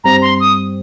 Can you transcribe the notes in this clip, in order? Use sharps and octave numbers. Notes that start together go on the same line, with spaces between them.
G2 G3 C4 A#5
C6
D#6